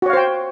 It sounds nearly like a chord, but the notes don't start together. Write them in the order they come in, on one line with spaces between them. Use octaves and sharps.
F#4 C#5 F5 C5 G5